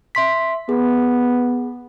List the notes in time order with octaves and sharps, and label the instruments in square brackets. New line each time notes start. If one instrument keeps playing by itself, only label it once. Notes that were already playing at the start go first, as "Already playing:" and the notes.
[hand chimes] E5 C6 B6
[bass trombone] B3 [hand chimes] G#4